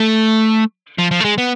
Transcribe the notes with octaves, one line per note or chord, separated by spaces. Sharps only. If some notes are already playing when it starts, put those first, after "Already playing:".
Already playing: A3
F3
F3
A3
G#3
B3